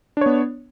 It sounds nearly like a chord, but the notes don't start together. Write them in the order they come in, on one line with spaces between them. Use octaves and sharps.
D4 C#5 B3